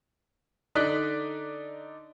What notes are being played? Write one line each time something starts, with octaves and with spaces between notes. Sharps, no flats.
D3 D#4 D5 D#5 F#6 B6